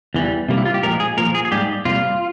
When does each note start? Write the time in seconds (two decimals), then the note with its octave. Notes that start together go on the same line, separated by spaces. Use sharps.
0.14 E2 E3 G3
0.49 C3 G3 A#3
0.57 E4
0.65 F4
0.74 G4
0.83 A#2 F3 G#3 A#4
1.00 G#4
1.17 A#2 F3 A#3 A#4
1.35 G#4
1.45 G#4
1.51 G#2 G3 A#3 G4
1.85 C3 G3 A#3 F4